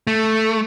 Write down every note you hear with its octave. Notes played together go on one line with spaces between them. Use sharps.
A3